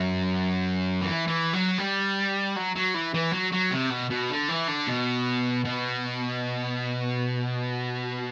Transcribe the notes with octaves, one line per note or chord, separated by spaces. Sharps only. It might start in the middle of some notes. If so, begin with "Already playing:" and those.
Already playing: F#2
E3
E3
F#3
G3
F#3
F#3
E3
E3
F#3
F#3
C3
B2
B2
D3
E3
D3
B2
B2